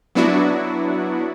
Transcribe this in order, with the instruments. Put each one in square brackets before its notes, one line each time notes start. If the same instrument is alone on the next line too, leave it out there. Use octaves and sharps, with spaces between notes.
[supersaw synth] F#3 B3 D4 E4 F#4